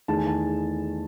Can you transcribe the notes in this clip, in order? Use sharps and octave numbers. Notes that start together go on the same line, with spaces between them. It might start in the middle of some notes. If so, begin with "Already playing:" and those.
E2 D#3 A3 A5
G#5
A5